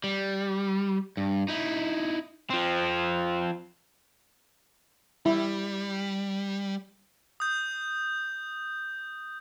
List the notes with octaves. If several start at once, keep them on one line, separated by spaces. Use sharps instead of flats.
G3
G2
D#4 E4
F3 C4
G3 E4
D#6 G6